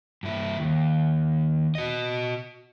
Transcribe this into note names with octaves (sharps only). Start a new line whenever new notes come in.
G2 E4
D#2
F#4 D#5